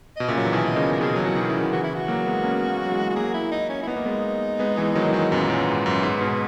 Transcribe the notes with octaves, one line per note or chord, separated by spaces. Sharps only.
B2 D#5
A#2 C#3 E5
F#3
E3
B2 D#3 E5
D#5
A#2 C#3
A#4
B2 D#3 G#4
F#3
E3 F#4
B2 D#3
C#3 E4
D#3
C#3 E3 F#4
E4
F#4
F#3 A#3
G#3 B3
A#3 C#4
F#3 A#3
F#3
E3 G#3
F#4
F#3 A#3 G#4
E4
D#4
C#4
E4
B3 D#4
A#3
G#3 B3
G#3 B3
E3 G#3
D#3 F#3
E3
D#3 F#3
F#2 A#2 B3
F#2 A#2
G#2
F#2
G#2
G#2 B2